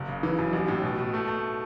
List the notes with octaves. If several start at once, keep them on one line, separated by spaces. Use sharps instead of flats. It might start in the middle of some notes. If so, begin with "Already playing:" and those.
Already playing: F#1
C#3
E3
F#2
A1
A2
B2
B2
A3
A3